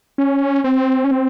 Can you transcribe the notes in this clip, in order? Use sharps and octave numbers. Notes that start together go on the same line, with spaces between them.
C#4
C4
C#4
C4